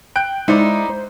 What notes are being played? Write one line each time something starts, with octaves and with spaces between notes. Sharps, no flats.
G5 F#6 G6 D7
G#3 D#4 E4 C5 D5
C5